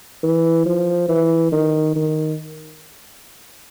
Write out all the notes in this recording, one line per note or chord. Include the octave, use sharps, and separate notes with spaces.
E3
F3
E3
D#3
D#3